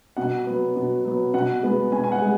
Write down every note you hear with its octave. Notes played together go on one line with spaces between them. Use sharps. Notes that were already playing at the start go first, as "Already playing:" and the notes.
B2 F#5
F#3 B3
B2
F#3 B3
B2 F#5
G#3 B3
B2 G#5
G#5
F#5
G#3